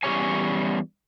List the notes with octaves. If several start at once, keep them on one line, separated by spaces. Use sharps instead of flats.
E2 G#2 G3 C#4 C#5 G#5